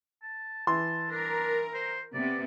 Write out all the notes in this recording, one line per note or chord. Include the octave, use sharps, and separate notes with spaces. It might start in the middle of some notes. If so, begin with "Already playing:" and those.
A5
E3 A5 C6
D4 A#4
C5
C3 B3 D5